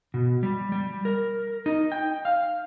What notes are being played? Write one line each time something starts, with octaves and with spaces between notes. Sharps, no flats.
B2
G3
G3
A#4
D#4
G5
F5